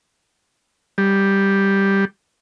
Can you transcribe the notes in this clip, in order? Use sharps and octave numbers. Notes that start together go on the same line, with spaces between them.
G3